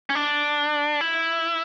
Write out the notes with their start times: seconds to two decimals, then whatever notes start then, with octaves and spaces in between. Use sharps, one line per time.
0.10 C#4
0.15 D4
1.01 E4